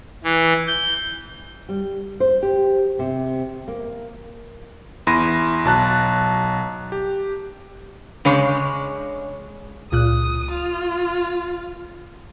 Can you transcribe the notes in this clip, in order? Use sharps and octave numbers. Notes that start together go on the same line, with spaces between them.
E3
G6
G3
C5
G4
C3
A#3
E2 E4 B5 C6 A#6 D#7
B1 F#3 A5 A#5 F#6
G4
C#3 G#3 D4 C#5
C#2 A#2 D#6 F#6
F4